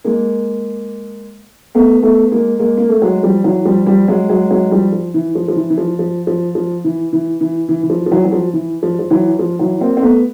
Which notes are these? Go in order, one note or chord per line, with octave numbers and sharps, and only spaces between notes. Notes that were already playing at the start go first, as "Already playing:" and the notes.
G#3 A#3
A3 B3
A3 B3
G#3 A#3
G#3 A#3
A#3
A3
F#3 G#3
F3 G3
E3 F#3
F3 G3
F3 G3
F#3 G#3
F#3 G#3
F#3 G#3
F3 G3
F3
E3
F3
F3
E3
E3
F3
F3
F3
F3
E3
E3
E3
E3
E3
F3
F3
E3 F#3
F#3
F3
E3
F3
F3
E3 F#3
F3
E3 F#3
A#3 C4
C4
A3 B3